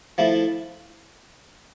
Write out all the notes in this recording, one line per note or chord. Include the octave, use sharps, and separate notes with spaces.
F3 A3 E4